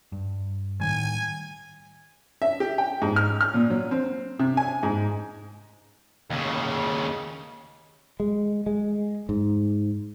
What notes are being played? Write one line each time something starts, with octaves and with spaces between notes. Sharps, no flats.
G2
A2 D#3 G3 G#5
E5
G4
G5
G#2
F6
F6
A#2
F#3
C4
C3
G#5
G#2
D#2 C#3
G#3
G#3
G#2